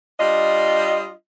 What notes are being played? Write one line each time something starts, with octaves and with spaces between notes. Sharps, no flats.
G3 D4 F4 D#5